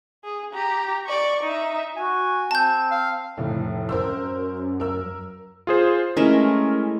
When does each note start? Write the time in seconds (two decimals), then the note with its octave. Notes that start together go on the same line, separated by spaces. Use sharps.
0.24 G#4
0.54 G4 A#5
1.06 D5 C#6
1.44 D#4 E5
1.97 F#4 G#5
2.51 C4 A5 G6
2.91 F5
3.37 F1 A2
3.89 F#2 A#4 C5 E6
4.80 A#4 E6
5.67 F4 G#4 C5
6.17 E3 G#3 A3 C#4 A#4